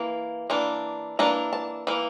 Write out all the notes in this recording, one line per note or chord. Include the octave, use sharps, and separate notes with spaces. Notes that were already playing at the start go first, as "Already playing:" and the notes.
Already playing: E3 A#3
E3 A#3 D4
E3 A#3 D4 A#5
A5
E3 A#3